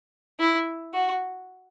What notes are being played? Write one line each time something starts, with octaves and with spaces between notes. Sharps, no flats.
E4
F#4